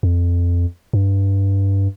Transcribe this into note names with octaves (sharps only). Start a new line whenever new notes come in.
F2
G2